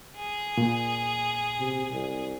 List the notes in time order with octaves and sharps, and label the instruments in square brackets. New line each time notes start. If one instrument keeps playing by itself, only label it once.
[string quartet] G#4
[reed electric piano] A#2
[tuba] C3
C2